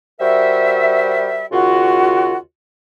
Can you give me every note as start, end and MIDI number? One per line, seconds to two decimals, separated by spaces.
0.20 1.45 55
0.20 1.45 66
0.20 1.45 70
0.20 1.45 72
0.20 1.45 76
1.51 2.35 39
1.51 2.35 49
1.51 2.35 65
1.51 2.35 66